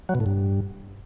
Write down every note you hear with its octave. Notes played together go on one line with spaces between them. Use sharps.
F#3
B2
A2
G2